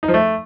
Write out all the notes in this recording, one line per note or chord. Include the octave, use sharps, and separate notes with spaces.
D#4
F3
A3